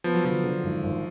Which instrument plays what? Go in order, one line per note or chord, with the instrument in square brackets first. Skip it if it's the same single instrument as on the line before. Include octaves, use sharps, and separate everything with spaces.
[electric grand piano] F3 [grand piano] B3
[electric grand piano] F#3
[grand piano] D3 [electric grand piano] F3
[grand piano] D3
G#1
G#1